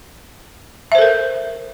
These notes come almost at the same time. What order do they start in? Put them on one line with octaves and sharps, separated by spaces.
E5 C5 A4 A#4